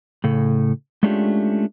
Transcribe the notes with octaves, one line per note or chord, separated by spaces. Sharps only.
A2 C#3 A4
G#3 A3 C#4 D4 F4 G4